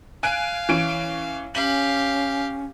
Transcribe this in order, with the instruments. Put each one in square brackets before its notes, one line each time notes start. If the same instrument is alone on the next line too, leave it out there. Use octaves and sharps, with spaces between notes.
[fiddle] F5 [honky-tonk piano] G#5 F#6 D7
[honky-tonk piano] E3 C#4 D7
[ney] C#4 [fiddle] G4 F5 [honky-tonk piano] F#7